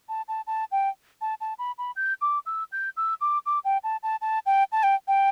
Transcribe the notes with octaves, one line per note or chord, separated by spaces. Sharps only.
A5
A5
A5
G5
A5
A5
B5
B5
G6
D6
E6
G6
E6
D6
D6
G5
A5
A5
A5
G5
A5
G5
G5